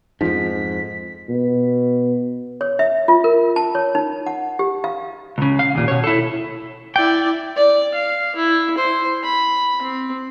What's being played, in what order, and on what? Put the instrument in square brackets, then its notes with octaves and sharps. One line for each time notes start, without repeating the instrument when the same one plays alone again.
[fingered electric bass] F2 G#2 [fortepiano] F3 [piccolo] B6
[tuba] B2
[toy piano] C#5
E5
F4
A#4
A5
C#5
D#4
F#5
G4
F5
[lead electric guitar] C#2 C#3
F5
D#2 A#2
B2 C#5
E4 A4
[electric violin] E4 D5 [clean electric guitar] G5
[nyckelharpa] D5
F5
E4
C5
B5
C4